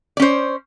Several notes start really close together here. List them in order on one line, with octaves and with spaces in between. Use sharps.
D5 C#4 C5